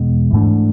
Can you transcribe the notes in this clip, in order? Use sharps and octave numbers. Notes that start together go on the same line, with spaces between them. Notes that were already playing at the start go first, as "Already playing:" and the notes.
Already playing: E2 B2 G#3
G#2 E3 A3 D4